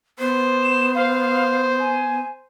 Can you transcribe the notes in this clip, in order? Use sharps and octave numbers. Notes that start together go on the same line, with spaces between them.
B3 C5
E7
C5 F5
G#5